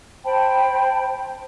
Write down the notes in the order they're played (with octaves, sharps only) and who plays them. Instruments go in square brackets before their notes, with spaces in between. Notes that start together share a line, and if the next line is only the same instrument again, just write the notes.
[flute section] C5 G5 A5 B5